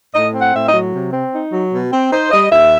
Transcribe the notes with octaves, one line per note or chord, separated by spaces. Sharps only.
A2 D#5
C4
F#5
A2 E5
D#5
F#3
C3
C4
D#4
F#3
B2
C4
D#4 C5
G3 D#5
D#2 E5